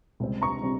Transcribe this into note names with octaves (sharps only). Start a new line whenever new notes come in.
C#2 C3 G3 C4
A#5 C#6
C3 G3 C4